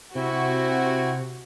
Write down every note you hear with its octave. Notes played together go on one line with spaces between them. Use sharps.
C3 C4 E4 F#4